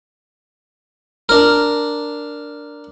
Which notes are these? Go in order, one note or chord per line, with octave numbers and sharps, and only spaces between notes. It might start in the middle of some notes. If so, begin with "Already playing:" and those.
D4 A#4